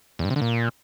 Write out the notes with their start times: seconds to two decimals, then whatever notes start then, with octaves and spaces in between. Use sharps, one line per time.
0.19 E2
0.25 G2
0.30 C3
0.36 D3
0.41 A#2